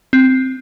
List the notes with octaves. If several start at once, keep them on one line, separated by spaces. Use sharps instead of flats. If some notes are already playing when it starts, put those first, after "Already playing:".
C4